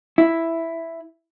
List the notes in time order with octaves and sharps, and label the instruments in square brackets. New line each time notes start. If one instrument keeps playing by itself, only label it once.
[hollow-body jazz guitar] E4